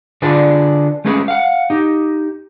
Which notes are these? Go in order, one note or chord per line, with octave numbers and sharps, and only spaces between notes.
D3 D4 F4 G#4 B4 D5
G#3 A3 C#4 G#4 B4
F5 F#5
D#4 G4